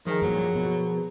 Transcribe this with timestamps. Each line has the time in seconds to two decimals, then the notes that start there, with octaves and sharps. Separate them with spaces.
0.06 D#3 F3 G#4 A#4 E5 G#5 A#5
0.22 G2 A#2 F#3
0.55 B2